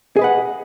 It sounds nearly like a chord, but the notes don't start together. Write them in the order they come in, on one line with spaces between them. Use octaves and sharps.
G#4 D#5 B4 F#5